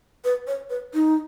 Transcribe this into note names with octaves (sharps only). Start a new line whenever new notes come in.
B4
C#5
B4
D#4